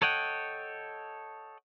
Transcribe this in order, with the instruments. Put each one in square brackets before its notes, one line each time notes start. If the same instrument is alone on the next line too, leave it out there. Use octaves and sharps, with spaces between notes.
[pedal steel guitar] A4 C#5 D#5 F#5 G5